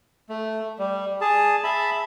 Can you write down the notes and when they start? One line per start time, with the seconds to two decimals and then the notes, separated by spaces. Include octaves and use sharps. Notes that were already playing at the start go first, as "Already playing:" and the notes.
0.29 A3
0.79 G3
1.21 G#4 A5
1.64 E5 A5 B5